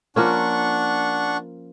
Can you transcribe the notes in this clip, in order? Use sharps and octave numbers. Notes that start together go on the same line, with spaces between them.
F3 A#3 C#4 D4 F#5 C#6